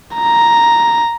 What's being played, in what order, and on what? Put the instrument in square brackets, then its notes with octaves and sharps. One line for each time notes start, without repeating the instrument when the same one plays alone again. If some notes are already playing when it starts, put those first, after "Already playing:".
[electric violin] A#5